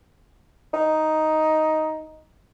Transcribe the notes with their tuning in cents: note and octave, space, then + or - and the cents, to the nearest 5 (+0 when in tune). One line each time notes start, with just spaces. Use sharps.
D#4 +5